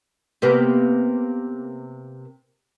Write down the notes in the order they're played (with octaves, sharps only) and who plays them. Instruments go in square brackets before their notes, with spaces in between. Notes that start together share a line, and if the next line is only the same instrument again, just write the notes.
[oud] C3 A#3 B3